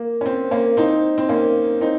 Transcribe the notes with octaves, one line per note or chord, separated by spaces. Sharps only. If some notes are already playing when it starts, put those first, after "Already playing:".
Already playing: A#3
C#4
C4
A#3 C#4
C4 D#4
C4
A#3 C#4
C4 D#4